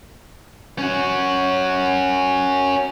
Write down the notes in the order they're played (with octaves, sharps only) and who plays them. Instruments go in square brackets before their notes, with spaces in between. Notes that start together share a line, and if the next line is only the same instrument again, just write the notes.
[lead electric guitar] C#4 F#4